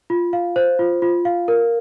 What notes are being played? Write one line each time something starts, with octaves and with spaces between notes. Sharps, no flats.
F4
F5
C5
F4
F4
F5
A#4